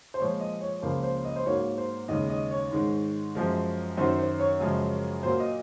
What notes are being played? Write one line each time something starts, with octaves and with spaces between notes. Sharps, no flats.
C5
A#2 F3 G#3 C#5
D#5
C#5
C#2 C#3 F3 A#3 C5
C5
D#5
C5
G#2 F#3 A#3 C#5
C5
D#2 C#3 G#3 D#5
D#5
C#5
G#2 D#3 G#3
F#2 F3 G#3
F#2 D#3 F#3 C5
C5
C#5
F#2 C#3 F3 G#3
A#2 F#3 A#3 C5
D#5